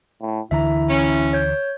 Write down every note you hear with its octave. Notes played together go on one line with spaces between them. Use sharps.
A2
D2 D3 E3 E4 E5 A#5
C#4
C#5 G6